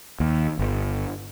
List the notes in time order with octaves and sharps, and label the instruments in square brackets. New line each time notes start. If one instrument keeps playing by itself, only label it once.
[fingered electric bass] D#2
G1